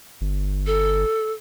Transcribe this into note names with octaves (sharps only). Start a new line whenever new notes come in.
G1
A4